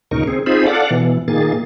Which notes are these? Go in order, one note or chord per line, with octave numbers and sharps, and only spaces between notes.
D2 A#2 C#3 D#4 A#4 C#6
C4 G#4
C4 D#4 F4 G#4 C5 B5
A4 D5 F5 F#5
B2 E3
A#2 D#3 A#3 G#4 A6